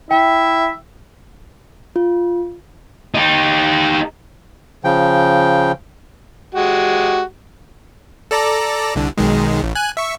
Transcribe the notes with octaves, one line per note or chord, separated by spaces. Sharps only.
E4 E5 G5
F4
D#4 G4
C#3 F3 G5
G#3 F#4 G4
A4 D5 A#5
C2 D3
B1 D#3 G#3
A1
G#5 F#6
E5 C#6